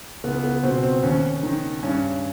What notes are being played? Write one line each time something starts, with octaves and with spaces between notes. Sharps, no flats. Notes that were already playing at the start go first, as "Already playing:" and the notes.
C#2 B3
B3
B2 C4
C4
D#2 C#4
D#3
G2 C#4